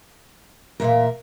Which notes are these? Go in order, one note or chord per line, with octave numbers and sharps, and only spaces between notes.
E2 A#2 A#4 E5 F5